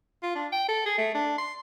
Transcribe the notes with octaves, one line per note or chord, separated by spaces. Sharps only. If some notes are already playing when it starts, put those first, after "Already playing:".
F4
D4
G5
A4
G#4
A3
D4
C6